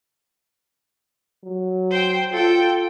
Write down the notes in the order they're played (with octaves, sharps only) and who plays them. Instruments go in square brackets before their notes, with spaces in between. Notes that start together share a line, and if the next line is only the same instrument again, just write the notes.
[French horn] F#3
[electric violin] C5 G5
[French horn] F4 [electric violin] A4 G5